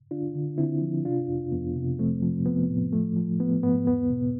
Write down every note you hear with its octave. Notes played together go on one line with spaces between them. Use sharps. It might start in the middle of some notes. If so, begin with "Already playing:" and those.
D3 D4 F4
D3
D3 C4 E4
F3
C3 D4 F4
F2
F2 B3
C3
F3 A3 C4
F3
F3 B3
A2
F3 A3
F3
F3 B3
G#2 B3
E2 B3
B2